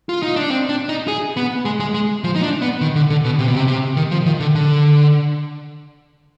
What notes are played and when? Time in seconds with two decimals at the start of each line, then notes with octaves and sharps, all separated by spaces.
0.09 F4
0.23 D#4
0.36 D4
0.50 C4
0.69 D4
0.89 D#4
1.08 G#4
1.37 B3
1.65 G#3
1.80 G#3
1.94 G#3
2.24 F3
2.36 D#4
2.43 D4
2.62 B3
2.81 D#3
2.95 D3
3.10 D3
3.25 B2
3.39 C3
3.48 B2
3.56 C3
3.68 C3
3.96 D#3
4.11 F3
4.26 D#3
4.40 D3
4.55 D3